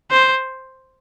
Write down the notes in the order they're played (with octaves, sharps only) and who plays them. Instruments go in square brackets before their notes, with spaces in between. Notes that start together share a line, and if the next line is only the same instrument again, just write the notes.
[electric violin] C5